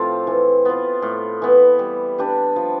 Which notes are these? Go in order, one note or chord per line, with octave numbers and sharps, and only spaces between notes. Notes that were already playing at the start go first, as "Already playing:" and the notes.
Already playing: A2 F3 C4 F4
E3
B3 F4
A2
E3 B3
G3
D4 G4 B4
F3